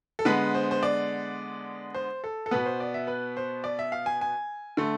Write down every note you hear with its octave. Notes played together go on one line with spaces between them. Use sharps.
A4
D3 G#3 B3 B4
C5
C5
D5
C5
A4
A4
B2 B3 B4
C5
D5
E5
B4
C5
D5
E5
F5
G#5
G#5
D3 A3